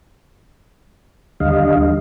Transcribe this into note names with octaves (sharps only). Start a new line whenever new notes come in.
D#2 D3 G3 D#5 F5